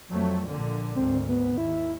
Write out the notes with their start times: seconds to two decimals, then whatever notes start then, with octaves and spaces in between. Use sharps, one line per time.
0.10 F2 F#3 A3
0.48 A#1 A#2 D3
0.95 G#1 D2 C4
1.28 B3
1.58 D#2 E4